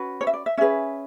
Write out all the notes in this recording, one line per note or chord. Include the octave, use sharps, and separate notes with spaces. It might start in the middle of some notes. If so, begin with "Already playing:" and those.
Already playing: C#4 F#4 B4
C#5
E5
D5
E5
C#4 G#4 B4 E5